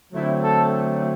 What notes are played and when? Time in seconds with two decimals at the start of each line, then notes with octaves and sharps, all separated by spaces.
0.13 D3 F#3 A3 C4 E4
0.42 A4